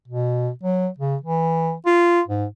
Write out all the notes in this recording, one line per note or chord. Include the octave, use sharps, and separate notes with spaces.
B2
F#3
C#3
E3
F4
G#2